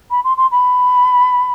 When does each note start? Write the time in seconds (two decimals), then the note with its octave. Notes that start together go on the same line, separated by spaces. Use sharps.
0.10 B5
0.24 C6
0.37 C6
0.51 B5